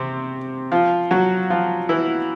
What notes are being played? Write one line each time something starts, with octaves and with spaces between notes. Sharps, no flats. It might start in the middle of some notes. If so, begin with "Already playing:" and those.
Already playing: C3 C4
F3 F4
F#3 F#4
F3 F4
E3 E4